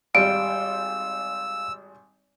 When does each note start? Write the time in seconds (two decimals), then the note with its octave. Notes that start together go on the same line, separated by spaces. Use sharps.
0.15 G#1 G3 F5 E6 D7